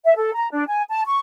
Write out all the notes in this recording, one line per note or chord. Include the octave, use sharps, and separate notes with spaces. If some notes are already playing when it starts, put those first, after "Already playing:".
E5
A4
A#5
D4
G#5
A5
C#6